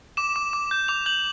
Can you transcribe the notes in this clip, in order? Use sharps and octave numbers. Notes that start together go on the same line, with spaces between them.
D6 E7
D6
D6
G6
D6 F7
G6 F#7